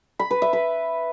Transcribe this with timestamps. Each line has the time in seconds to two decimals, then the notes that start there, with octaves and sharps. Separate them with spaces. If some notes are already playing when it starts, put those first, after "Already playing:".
0.19 B5
0.31 B4
0.42 E5
0.53 B4